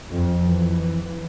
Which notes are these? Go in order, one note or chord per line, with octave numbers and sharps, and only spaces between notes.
F2
E3